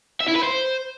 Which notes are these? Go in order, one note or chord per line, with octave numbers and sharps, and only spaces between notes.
E5
E4
B4
C5